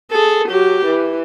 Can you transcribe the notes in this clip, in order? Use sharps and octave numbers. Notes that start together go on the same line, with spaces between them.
G#4 A4
F#3 G4
E3